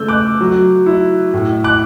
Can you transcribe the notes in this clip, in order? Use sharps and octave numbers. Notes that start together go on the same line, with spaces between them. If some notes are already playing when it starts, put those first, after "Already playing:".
Already playing: C#3 A3 E6 G6
D6 F#6
F#3
E4
A2
D6 F#6